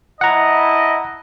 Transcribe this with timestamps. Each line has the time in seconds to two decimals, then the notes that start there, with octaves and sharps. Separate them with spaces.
0.21 E4 D#5 F#5 A5 A#5